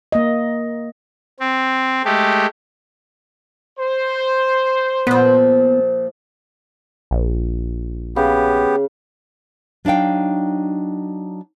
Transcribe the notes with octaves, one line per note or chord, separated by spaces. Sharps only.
A#3 D#5
C4
G#3 A3 G4
C5
A#2 F3 B3
A#1
C#3 B3 G4
F#3 D4 D#4 F5 G5